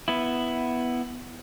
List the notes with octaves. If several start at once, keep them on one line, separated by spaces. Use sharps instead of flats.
B3 E4